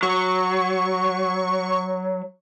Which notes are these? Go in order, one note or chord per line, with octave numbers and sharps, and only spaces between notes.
F#3 C#6